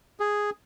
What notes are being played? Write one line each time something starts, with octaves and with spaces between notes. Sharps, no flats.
G#4